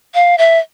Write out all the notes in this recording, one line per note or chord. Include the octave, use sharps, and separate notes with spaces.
F5
E5